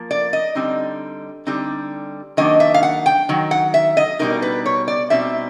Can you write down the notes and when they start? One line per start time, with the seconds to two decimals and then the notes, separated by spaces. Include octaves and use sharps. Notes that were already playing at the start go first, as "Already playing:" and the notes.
Already playing: F3 A#3
0.11 D5
0.33 D#5
0.55 D3 G3 C4 D#4
1.47 D3 G3 C4 D#4
2.37 D#3 F#3 A#3 D4 D#5
2.60 E5
2.74 F5
2.83 F#5
3.06 G5
3.29 D#3 F#3
3.51 F#5
3.74 E5
3.97 D#5
4.19 B2 G3 C4 D#4 A#4
4.42 B4
4.66 C#5
4.88 D5
5.10 B2 G3 C4 D#4 E5